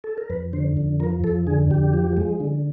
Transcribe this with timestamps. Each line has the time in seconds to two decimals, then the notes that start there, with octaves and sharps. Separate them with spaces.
0.04 A4
0.18 A#4
0.30 F2 B4
0.53 D3 C5
0.77 F2
1.00 F3 A#4
1.24 F2 A4
1.47 D3 G#4
1.70 F2 G4
1.94 F3
2.17 G#3
2.40 D3